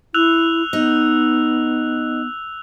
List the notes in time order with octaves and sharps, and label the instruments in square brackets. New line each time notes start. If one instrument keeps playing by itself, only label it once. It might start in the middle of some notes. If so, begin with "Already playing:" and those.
[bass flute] E4 [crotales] E6 F#6 F7
[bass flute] B3 [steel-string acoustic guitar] D#4